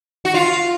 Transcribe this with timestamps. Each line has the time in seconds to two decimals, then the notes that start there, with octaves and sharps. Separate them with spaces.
0.25 F#4
0.34 F4